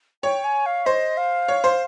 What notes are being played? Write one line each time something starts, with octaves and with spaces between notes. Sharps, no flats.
C#5 G5
G#5
F5
C5 D#5
F5
C#5
C5